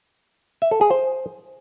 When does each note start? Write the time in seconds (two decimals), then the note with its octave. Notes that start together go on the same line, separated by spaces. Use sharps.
0.62 E5
0.71 A4
0.81 G#4
0.91 C5